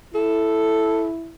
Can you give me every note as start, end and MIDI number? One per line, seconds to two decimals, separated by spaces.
0.14 1.34 64
0.14 1.09 69